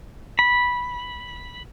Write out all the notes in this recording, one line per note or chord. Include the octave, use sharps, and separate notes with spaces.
B5